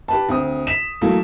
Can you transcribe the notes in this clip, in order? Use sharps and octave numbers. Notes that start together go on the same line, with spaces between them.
G4 B4 A5
D2 C4 D#6
B6 E7
E3 F#3 A3 A#3